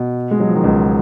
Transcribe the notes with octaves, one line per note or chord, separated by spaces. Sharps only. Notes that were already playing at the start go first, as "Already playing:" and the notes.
Already playing: B2
G#3
F#3
F3
D#3
C#2 C#3